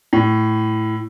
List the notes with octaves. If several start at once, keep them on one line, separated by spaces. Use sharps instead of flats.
A2